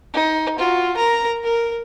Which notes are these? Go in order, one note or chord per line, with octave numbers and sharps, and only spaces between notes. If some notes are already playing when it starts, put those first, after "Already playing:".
D#4
F4 F#4
A#4 A#5
A#4